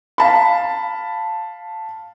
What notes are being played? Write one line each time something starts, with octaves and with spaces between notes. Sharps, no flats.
F5 A5 B5